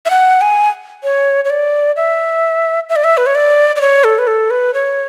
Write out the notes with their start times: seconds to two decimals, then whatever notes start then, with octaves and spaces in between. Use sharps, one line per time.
0.05 E5
0.10 F#5
0.41 G#5
1.04 C#5
1.45 C#5
1.50 D5
1.96 E5
2.89 E5
2.96 D5
3.04 E5
3.17 B4
3.26 C#5
3.35 D5
3.76 D5
3.81 C#5
4.04 A4
4.19 B4
4.27 A4
4.50 B4
4.74 C#5